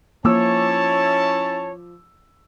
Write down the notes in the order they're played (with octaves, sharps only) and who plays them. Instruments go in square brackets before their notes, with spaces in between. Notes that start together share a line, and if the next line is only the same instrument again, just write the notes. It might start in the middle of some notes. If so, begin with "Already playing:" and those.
[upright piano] F3 D6 E6 [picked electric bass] A#3 [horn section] C#4 E4 A5 [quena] C#5